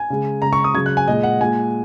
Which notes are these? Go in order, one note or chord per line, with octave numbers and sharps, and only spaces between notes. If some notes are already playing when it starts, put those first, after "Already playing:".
Already playing: G#5
C#3 G#3
C#3 G#3 A#5
C#6
D#6
C#3 F#3 G#6
F#6
G#5
A#2 G#3 D#5
F#5
A#2 G#3 G#5